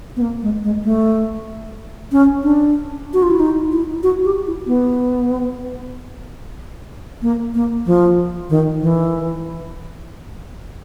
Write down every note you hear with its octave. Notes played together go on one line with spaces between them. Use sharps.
B3
A#3
G#3
G#3
A3
C#4
D4
F#4
F4
E4
D#4
E4
F#4
G4
E4
B3
A#3
A#3
F3
D#3
E3